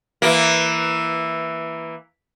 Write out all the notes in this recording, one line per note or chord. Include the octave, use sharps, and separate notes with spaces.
E3 A#3